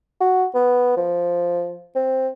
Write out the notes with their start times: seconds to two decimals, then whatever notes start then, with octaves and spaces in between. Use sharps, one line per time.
0.20 F#4
0.54 B3
0.97 F3
1.95 C4